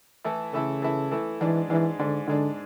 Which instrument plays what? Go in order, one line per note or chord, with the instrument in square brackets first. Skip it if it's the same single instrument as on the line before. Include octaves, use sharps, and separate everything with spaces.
[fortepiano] E3 A3 E4 A4
[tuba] C#3 [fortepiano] E3 A3 E4 A4
[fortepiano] E3 A3 E4 A4
E3 A3 E4 A4
[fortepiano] G#2 G#3 D4 [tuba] E3
[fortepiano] G#2 G#3 D4 [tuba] E3
[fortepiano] G#2 G#3 D4 [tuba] D3
[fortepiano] G#2 G#3 D4 [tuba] D3